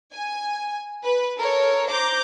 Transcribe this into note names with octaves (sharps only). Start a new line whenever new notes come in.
G#5
B4
A4 A#4 C#5
C5 A#5 D6 G6